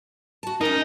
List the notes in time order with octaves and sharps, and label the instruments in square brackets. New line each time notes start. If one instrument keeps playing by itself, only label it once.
[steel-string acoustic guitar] F#4 A5
[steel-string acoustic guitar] C#4 A#4 [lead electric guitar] D#4